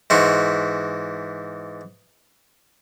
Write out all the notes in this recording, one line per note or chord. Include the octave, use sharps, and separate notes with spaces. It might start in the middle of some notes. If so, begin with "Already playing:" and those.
G#2 E3 F#4 C6